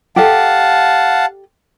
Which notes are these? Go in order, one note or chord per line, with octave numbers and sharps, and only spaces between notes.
G4 A4 D#5 F5 F#5 A5